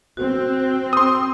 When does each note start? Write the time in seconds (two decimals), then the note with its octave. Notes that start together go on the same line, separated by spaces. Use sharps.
0.17 C4 F#4
0.93 C6 D#6 E6